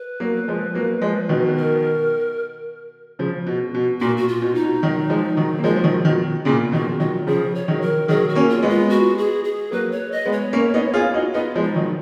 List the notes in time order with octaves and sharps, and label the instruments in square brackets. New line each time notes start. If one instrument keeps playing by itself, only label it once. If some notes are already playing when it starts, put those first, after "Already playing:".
Already playing: [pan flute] B4
[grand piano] F#3 A#3
F3 G#3
F#3 A#3
F3 G#3
B2 D#3
[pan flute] A#4
[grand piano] C#3 F3
B2
B2
[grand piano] A#2 [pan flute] F#4
[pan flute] F#4
F4
[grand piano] B2
[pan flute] D#4
[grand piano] B2
D#3 F#3
F3 G#3
D#3 F#3
A#3
[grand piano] F3 G#3 [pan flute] F4
[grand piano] F3
D#3 F#3
B2 D#3
[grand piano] A#2 C#3 [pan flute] F4
[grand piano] B2 D#3 [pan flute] F#4
[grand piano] D#3 F#3 [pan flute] F4
[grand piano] C#3 F3 [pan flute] G#4
[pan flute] C#5
[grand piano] D#3 F#3
[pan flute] A#4
[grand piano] D#3 F#3 [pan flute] G#4
[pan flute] F#4
[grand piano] A#3 C#4
[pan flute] F4
[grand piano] G#3 B3
[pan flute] F4
F#4
G#4
G#4
[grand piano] F#3 A#3 [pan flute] B4
[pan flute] C#5
D#5
[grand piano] G#3 B3
[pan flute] C#5
[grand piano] A#3 C#4
B3 D#4
F4 G#4
D#4 F#4
[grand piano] B3 D#4 [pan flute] F4
[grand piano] F3 G#3
[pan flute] D#4
[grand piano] D#3 F#3